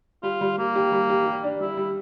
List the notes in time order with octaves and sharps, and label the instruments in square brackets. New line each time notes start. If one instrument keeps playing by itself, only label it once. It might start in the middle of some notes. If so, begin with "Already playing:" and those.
[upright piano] G3 [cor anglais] F4
[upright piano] G3
[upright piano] G3 [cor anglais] A#3
[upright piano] G4
G3
G4
G4
D4
[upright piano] G3 [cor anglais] E4
[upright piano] G3